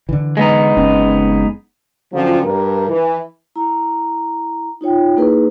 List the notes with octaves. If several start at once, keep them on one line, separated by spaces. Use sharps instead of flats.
D3 E3
G#3 B3 D#4
F#1 C4 C#4
D3 F3 F#3 C4 C#4 F4
G2 A#4
E3
E4 A#5
D#4 F4 C#5 G5
A#3 D#4 E4 G#4 A#4 B4